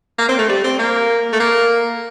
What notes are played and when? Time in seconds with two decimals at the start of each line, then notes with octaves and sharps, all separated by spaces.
0.19 A#3
0.29 C4
0.39 A3
0.49 G3
0.64 C4
0.79 A#3
1.33 A3
1.40 A#3